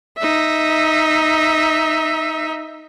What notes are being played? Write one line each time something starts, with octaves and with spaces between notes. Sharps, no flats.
D#4 E5